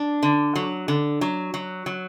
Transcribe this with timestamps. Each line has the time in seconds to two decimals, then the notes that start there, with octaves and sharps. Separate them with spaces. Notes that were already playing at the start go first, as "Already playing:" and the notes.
Already playing: D4
0.23 D3
0.56 F#3
0.88 D3
1.21 F#3
1.54 F#3
1.86 F#3